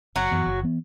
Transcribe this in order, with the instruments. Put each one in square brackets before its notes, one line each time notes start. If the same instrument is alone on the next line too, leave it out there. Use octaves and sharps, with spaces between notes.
[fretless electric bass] F#1 [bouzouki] F#3 F#4
[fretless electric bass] F#2 E3 B3
F#1
E3 B3